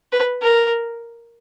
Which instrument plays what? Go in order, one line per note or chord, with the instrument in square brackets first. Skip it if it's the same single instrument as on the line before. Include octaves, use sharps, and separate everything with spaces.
[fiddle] B4
A#4